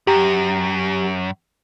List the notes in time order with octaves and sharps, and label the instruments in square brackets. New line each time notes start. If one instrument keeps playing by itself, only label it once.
[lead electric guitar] F#2 [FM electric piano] G4 A#5